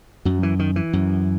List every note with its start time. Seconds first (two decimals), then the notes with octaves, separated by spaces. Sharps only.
0.25 F#2 F#3
0.43 E3
0.59 D#3
0.76 E3
0.93 F#2